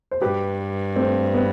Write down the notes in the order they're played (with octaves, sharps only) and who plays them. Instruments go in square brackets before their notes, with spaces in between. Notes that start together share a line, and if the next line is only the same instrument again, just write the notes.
[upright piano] C5
[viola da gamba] G2 [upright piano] G4 B4
[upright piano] A3 C4
B3